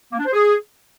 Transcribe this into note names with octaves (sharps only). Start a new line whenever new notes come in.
A#3
D4
C5
G#4